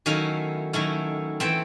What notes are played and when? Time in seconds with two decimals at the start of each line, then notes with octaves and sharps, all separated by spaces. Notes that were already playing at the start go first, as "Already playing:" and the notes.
0.06 D#3 F#3 A3 C#4 E4 F5
0.73 D#3 F#3 A3 C#4 E4
1.40 E3 A3 C4 G5